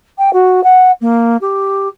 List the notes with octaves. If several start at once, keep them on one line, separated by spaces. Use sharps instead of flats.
G5
F#4
F#5
A#3
G4